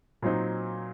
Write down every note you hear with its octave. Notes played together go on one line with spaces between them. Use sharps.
A#2 F#3 C4 D#4